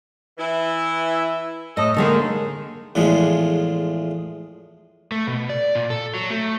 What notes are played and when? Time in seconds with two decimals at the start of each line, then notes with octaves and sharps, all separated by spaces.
0.38 E3 E4
1.77 A2 A4 D#5
1.97 D3 D#3 G#3 A#3
2.95 E2 A2 F3 G#3
5.12 A3
5.27 B2
5.49 D5
5.75 A#2
5.90 A4
6.14 F#3
6.30 A3